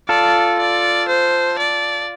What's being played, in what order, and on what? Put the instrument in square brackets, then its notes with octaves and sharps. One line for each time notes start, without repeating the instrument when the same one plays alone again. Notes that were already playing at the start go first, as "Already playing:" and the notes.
[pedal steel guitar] F4 A4 [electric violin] D5
[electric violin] D5
C5
D5